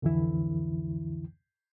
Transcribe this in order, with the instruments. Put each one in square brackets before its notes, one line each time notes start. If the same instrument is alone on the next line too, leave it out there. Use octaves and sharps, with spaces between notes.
[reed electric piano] C2 F2 D3 E3 E4